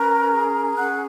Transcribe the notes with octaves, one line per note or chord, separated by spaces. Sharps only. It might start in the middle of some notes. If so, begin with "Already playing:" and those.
Already playing: C#4 A#4 B4 A#5
G#4
C#4 F#5 F#6